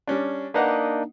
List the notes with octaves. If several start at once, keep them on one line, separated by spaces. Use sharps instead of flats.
G3 C#4 D4
A#3 D4 D#4 B4 D#5 F#5